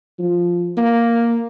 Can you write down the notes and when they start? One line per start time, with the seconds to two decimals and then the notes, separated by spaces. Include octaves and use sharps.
0.19 F3
0.78 A#3